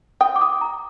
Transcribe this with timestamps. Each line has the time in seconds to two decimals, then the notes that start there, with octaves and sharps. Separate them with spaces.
0.21 G5 D#6
0.36 D6
0.41 D#6
0.61 A#5